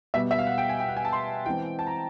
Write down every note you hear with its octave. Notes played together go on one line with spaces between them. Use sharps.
B2 G3 B3 E5
E5
F5
F#5
G5
G#5
G5
F#5
G#5
A5
C6
E3 G#3 C4 G5
A5
A#5